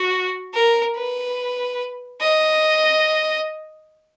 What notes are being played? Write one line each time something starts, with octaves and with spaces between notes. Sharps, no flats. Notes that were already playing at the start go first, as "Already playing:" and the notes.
Already playing: F#4
A#4
B4
D#5